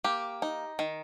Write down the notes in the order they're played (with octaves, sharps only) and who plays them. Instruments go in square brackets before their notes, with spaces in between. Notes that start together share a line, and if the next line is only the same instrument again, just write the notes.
[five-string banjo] A#3 G4
D#4
D#3